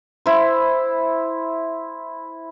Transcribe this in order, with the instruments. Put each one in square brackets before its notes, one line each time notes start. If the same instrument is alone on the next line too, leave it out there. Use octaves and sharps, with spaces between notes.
[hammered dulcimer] E4 C5